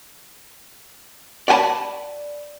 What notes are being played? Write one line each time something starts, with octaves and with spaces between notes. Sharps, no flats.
D5 F#5 G#5 A5 B5